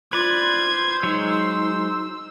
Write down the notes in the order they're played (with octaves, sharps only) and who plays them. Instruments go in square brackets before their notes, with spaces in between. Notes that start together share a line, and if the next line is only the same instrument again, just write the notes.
[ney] F4 [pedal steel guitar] B4 D5 [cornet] C5 [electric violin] G#6
[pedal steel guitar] F#3 G#3 [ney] D#4 [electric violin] E6